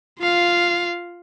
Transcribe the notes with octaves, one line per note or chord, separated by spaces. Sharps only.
F4 F5